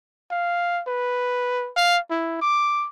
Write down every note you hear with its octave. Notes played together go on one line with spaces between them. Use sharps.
F5
B4
F5
E4
D6